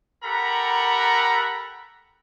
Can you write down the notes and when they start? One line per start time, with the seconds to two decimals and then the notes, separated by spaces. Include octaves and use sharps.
0.24 G4 A4 A#4 F#5 A#5 B5